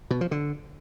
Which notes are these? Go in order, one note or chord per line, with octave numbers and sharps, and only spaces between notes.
B2
F3
D3